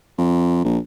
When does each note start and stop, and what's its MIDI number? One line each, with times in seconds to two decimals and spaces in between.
0.18 0.64 41
0.64 0.78 34